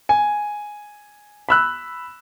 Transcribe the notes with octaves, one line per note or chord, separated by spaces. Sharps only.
G#5
B5 E6 F#6